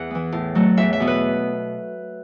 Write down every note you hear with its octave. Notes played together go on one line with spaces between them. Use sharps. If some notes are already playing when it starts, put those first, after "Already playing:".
Already playing: E2 F#5
E3 B3
A2
F#3 A3
E2 E5
E5
B2 B3
B4